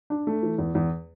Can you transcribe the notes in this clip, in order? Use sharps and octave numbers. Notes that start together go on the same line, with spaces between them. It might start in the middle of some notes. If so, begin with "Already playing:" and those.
D4
A3
E3
E2
E2